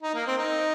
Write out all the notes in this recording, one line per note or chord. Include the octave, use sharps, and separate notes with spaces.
D#4
A#3
C4
D#4